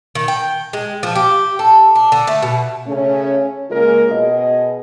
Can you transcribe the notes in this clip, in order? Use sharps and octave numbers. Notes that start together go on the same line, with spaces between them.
D#3
G5
G#3
F3
G4
A4
D4
D3
A3
B2
C#3 A3 C#4
C#3 G#3 A#3 F4 A#4
B2 G#4 D#5